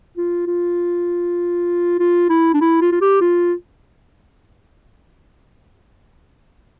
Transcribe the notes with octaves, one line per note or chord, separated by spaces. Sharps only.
F4
F4
F4
E4
D4
E4
F4
F4
G4
F4